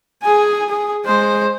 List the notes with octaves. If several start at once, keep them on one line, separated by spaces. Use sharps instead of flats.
G#4 G#5
G#4
G#3 C5